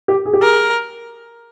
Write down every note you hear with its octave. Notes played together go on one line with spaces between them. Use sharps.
G4
G#4
G4
G#4 A#4